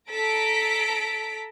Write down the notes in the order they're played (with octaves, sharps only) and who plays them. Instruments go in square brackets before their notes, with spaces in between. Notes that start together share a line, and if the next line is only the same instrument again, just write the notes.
[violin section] A4 A#5 B6 D7